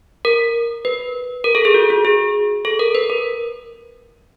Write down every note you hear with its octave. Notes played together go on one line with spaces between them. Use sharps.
A#4
B4
A#4
A4
G#4
F#4
F#4
G#4
A4
A#4
B4
A#4